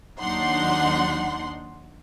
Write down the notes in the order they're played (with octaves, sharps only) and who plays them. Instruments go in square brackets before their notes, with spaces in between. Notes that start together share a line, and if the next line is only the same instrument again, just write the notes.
[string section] D#2 F#3 D4 D#4 F#5 C6